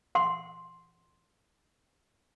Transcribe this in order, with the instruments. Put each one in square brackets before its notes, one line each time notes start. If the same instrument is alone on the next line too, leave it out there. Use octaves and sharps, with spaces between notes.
[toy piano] F#5 C6